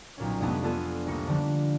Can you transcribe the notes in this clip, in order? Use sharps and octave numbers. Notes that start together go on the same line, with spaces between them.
B1 A#2 C#4
F2 C3 G#3 A3 B3 D4
B3 D4 F4 A4 G#5
C2 A#3 C#7
D3 F3 G3 D4